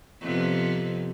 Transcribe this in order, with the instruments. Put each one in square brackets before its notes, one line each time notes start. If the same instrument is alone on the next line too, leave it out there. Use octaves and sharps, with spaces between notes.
[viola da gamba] F2 C3 B3